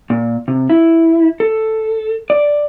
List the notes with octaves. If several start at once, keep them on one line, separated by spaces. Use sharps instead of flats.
A#2
C3
E4
A4
D5